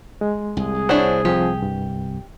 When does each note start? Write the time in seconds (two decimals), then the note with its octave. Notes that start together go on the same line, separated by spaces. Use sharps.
0.21 G#3
0.57 C2 G#4
0.89 D4 E4 C5 C#5 F#5
1.25 F3 C4 G4
1.62 G2